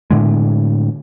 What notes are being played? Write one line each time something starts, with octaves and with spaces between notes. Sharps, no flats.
A2 D3 G#3